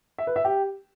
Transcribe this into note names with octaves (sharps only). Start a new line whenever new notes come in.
E5
B4
E5
G4